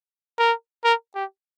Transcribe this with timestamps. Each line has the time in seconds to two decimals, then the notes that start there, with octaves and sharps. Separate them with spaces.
0.38 A#4
0.84 A#4
1.15 G4